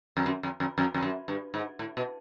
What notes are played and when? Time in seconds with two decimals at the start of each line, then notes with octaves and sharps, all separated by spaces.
0.17 F2
0.26 F#2
0.43 F2
0.60 F2
0.78 F2
0.94 F2
1.03 F#2
1.28 G2
1.54 G#2
1.79 A2
1.97 B2